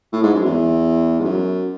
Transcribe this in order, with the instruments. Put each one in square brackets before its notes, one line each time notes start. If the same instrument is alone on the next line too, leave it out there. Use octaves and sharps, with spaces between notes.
[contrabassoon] A2
G#2
F#2
E2
G#2
F#2